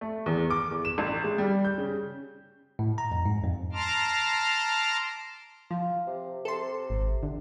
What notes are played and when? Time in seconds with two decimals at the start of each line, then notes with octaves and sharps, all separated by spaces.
0.01 A3
0.26 E2
0.50 D6
0.71 E2
0.85 E7
0.98 A1
1.24 G#3
1.38 G3
1.65 G6
1.78 C#3
2.79 A2
2.98 A#5
3.12 F2
3.25 G#2
3.43 F2
3.73 A5 A#5 C6 D6 F6
5.71 F3 F4
6.07 C3
6.45 C3 A4 C6
6.90 G#1
7.23 D3